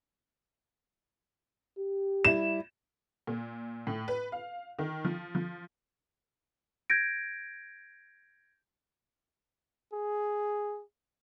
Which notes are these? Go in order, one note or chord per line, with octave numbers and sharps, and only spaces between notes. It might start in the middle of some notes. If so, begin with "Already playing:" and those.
G4
G3 E4 E7
A#2
A2
B4
F5
D#3
F3
F3
G6 G#6 A#6 D7
G#4